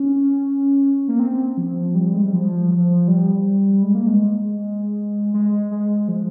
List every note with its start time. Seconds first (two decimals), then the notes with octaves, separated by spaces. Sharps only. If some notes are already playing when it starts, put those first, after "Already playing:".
Already playing: C#4
1.08 A#3
1.19 C4
1.58 F3
1.95 G3
2.13 G#3
2.22 G3
2.33 F3
2.71 F3
3.08 G3
3.83 G#3
3.95 A#3
4.07 G#3
5.34 G#3
5.71 G#3
6.08 F3